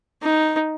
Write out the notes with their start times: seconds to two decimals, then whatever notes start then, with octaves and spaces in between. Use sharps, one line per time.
0.23 D#4